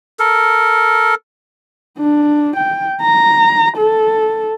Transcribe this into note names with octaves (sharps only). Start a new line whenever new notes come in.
A4 A#4
D4
G5
A#5
A4